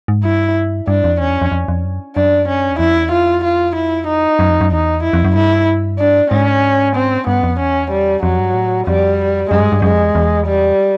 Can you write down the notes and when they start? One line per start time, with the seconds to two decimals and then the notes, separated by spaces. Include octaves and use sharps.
0.08 G#2
0.24 G2 E4
0.88 G2 D4
1.04 F2
1.20 E2 C#4
1.30 F2
1.42 F2
1.52 F2
1.68 F2
1.85 F#2
2.16 F#2 D4
2.48 C#4
2.70 E2
2.79 F2 E4
2.96 E2
3.12 F2 F4
3.44 F4
3.76 E4
4.08 D#4
4.39 F#2
4.50 F2
4.61 F#2
4.71 E2 D#4
5.03 F2 E4
5.13 F2
5.25 F#2
5.35 G2 E4
5.99 D4
6.31 G#2 C#4
6.96 C4
7.27 G2 B3
7.43 F2
7.59 E2 C#4
7.91 G3
8.23 F2 F#3
8.39 G2
8.54 A2
8.87 F2 G3
9.50 F#2 G#3
9.61 G2
9.72 G2
9.82 F#2 G#3
9.93 F2
10.04 E2
10.15 E2
10.46 G3